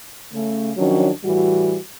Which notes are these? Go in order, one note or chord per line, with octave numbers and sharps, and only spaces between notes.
C#3 A3
D#3 F3 F#3 C#4 D4 F#4
A2 E3 G3 F#4